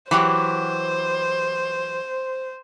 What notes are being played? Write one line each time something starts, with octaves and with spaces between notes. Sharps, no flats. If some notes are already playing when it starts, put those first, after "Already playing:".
E3 F#3 G4 C5